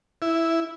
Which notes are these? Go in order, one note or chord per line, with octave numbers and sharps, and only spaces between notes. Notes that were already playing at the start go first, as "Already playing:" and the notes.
E4